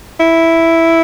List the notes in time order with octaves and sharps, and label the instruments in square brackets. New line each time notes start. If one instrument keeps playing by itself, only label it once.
[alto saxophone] E4